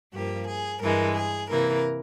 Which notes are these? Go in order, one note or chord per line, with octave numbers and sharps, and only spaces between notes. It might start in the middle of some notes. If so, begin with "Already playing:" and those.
G2 F3 A#3 G4
G#4
G2 E3 G#3 A#4
G#4
C3 E3 A#3 A#4